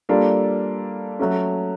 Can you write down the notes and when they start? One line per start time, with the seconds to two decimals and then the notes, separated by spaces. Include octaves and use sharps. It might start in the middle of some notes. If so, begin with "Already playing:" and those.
0.09 G3 A#3 D4 F4 A4
1.19 F#3 A3 C#4